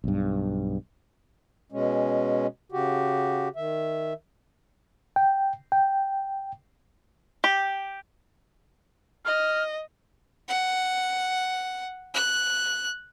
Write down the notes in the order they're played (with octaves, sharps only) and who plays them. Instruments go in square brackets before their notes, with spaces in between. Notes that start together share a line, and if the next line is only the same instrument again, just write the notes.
[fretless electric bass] B1 G2
[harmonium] B2 G#3 C#4
C#3 F#4 G4
D#3 E5
[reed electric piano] G5
G5
[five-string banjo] G4
[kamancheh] D#5 [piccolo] F6
[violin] F#5
F#6